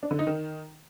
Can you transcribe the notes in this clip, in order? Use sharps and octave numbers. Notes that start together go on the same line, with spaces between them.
D4
D3
D#4
D#3